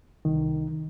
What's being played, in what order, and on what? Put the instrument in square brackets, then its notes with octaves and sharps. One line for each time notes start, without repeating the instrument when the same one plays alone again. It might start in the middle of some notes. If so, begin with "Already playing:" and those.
[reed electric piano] C2 D#3